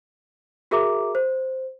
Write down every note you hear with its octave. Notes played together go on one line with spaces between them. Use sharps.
F#4 G#4 A#4 E5 A#5 D6
C5